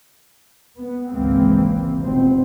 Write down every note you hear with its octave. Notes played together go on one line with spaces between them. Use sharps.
B3
G#1 C#2 E3 G#3 A#3 C4
F1 B2 C4